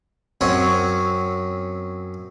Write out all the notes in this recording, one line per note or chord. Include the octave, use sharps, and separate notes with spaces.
F#2 C4 C#4 C#5 F#5